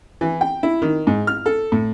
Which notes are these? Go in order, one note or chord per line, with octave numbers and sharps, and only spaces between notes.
E3
G5
E4
D#3
G#2
F6
A4
A2